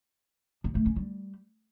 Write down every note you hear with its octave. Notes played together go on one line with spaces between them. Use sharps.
D4
A3
C#4
G3